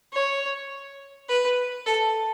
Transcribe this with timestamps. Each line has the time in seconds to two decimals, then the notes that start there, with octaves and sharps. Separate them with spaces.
0.13 C#5
1.28 B4
1.86 A4